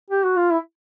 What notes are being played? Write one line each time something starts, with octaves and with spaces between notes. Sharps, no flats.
G4
F#4
F4
E4